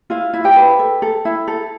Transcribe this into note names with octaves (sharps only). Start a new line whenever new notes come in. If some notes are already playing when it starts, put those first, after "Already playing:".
E4 F4 F5
E4
G4 G5
B4
A4
A4
E4
A4